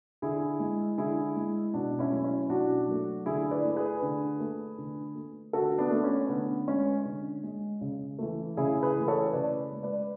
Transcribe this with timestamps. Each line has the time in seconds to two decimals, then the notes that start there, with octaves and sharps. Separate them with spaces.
0.22 D3 E4 G#4
0.60 G#3
0.98 D3 E4 G#4
1.36 G#3
1.73 B2 D4 F#4
1.99 C#4 E4
2.12 F#3 A3
2.24 C#4 E4
2.49 B2 D4 F#4
2.88 F#3 A3
3.26 D3 E4 G#4
3.51 B4 D5
3.64 A3
3.76 G#4 B4
4.02 D3
4.40 A3
4.78 D3
5.15 A3
5.53 D3 F#4 A4
5.78 B3 D4
5.91 A3
6.04 C#4
6.29 D3 B3
6.67 G#3 C#4
7.05 D3
7.44 G#3
7.81 C#3
8.19 E3 A3
8.57 C#3 E4 G#4
8.83 G#4 B4
8.95 E3 A3
9.08 A4 C#5
9.33 C#3 B4 D5
9.72 G#3
9.83 B4 D5